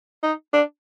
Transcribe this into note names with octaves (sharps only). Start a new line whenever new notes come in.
D#4
D4